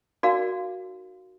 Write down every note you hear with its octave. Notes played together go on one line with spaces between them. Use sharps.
D#4 F#4 A#4 D5 F5